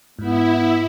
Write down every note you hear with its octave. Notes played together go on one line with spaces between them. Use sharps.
G#2 B3 E4